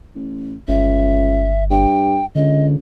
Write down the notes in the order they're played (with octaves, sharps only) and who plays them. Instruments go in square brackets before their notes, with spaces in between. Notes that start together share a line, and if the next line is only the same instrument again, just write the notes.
[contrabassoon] A1
[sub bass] G1 [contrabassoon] C#2 [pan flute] E5
[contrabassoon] G2 [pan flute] G5
[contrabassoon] C#2 [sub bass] D3 [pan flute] D#5